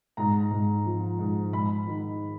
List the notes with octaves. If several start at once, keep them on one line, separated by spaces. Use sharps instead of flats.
G#2 A#5
G#2
F3
G#2
G#2 B5
D#3